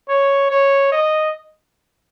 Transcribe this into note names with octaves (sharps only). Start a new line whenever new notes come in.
C#5
C#5
D#5